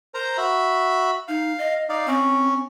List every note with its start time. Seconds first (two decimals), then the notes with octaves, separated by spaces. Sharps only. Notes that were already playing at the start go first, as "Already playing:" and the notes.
0.14 A#4 C5 A#5
0.38 F#4 E5 B5
1.28 D#4 F5
1.59 D#5
1.89 D#4 D5 F5
2.07 C4 C#4